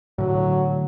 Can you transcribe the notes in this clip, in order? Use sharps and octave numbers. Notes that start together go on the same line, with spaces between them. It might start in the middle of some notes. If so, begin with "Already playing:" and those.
A2 D3 F#3